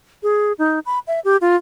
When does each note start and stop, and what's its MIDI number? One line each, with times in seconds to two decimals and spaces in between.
0.23 0.53 68
0.59 0.79 63
0.86 0.99 83
1.07 1.20 76
1.25 1.37 67
1.41 1.56 65